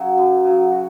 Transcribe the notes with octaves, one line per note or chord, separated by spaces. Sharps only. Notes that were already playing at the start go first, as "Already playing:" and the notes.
Already playing: C#3 F#3
F#2
C#3 F#3
F#4